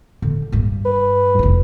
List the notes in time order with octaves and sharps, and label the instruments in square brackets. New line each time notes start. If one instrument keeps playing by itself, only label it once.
[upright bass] D3
G2 G3
[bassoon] B4
[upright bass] F1 E4